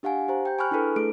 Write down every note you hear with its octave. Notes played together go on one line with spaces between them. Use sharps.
D4 G4 F5 F#5 G#5
G4 C5 A#5
G5 G6
G#5 B5 C#6 F6 F#6
D4 E4 G#4 A4 B4
A3 G#4 A4 D7